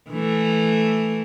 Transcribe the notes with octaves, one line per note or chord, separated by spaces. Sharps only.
E3 A3